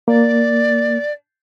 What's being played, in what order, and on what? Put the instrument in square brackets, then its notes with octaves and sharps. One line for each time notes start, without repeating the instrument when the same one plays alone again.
[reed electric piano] A#3 [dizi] D5